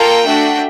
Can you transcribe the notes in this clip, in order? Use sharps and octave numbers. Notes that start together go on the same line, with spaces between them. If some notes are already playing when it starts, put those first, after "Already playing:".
Already playing: A#3 F4 A4 G5
A3 D4 F#4